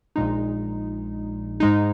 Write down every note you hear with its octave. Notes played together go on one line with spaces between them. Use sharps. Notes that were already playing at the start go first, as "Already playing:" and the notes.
A#1 A#2 G#3 D#4
G#2 G#3 D#4